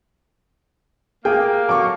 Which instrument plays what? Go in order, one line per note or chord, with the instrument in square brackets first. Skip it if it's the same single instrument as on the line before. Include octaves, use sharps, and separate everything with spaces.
[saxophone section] A#3 [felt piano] G#4 [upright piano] G5
[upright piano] F#3 A4 C#6 [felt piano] D6